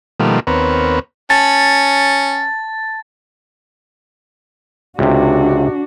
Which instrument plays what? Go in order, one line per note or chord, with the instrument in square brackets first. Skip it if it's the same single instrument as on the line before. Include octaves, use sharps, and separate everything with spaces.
[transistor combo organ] B2 D#3 F3 G3 A3 A#3
D#2 B3 C4 A#4 B4 C#5
[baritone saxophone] C#4 [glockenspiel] A5 [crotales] A6
[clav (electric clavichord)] C#2 C3 [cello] D4 F#4